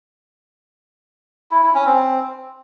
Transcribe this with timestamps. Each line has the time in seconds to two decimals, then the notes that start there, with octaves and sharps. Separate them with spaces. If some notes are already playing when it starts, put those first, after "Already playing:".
1.51 E4
1.63 E4
1.74 C#4
1.86 C4